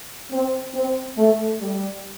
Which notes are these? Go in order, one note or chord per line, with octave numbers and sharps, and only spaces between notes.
C4
C4
A3
G3